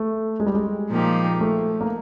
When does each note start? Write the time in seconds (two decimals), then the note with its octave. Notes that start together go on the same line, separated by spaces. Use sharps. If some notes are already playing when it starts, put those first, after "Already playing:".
Already playing: A3
0.40 G#3
0.46 G3
0.55 G#3
0.90 A#2 F3 A#3 D#4 G4
1.41 A3
1.81 A#3